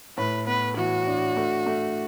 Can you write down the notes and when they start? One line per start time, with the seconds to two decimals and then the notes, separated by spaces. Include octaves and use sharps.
0.18 A2 B4
0.47 B3 B4
0.77 E3 F#4
1.07 D4
1.37 A3
1.66 A3